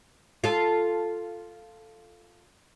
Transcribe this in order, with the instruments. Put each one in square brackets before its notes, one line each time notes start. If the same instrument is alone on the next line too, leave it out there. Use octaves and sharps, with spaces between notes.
[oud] F4 A4